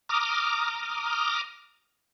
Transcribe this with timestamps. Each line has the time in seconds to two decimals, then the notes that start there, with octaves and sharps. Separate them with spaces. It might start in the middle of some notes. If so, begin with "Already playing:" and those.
0.09 A#5 D6 D#6 F6